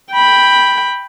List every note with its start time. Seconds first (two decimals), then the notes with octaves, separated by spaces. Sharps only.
0.13 G5 B5